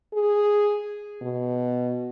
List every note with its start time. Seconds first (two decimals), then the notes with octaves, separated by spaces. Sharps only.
0.13 G#4
1.22 B2